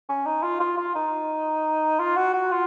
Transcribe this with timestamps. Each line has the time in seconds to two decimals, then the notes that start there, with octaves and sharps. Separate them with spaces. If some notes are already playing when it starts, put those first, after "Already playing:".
0.09 C#4
0.26 D#4
0.43 F4
0.60 F4
0.78 F4
0.95 D#4
1.99 F4
2.16 F#4
2.34 F#4
2.52 F4